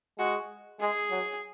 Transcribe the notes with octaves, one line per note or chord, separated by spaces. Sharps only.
G#3 F#4
G#3 G#4
F#3